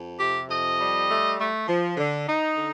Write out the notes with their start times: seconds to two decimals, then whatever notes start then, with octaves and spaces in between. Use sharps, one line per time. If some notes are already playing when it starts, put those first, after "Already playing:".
Already playing: F2
0.18 C3 G4
0.48 F2 D#5
0.78 G3
1.08 A3
1.39 A3
1.68 F3
1.97 D3
2.28 D#4
2.57 D3